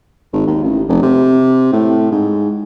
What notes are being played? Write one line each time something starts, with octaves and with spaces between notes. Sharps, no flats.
G#1
D#2
A1
F1
C3
A2
G#2